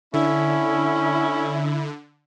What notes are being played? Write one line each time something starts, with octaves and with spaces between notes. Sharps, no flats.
D3 C#4 E4